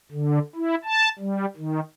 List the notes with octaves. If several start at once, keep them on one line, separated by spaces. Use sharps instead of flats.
D3
E4
A5
G3
D#3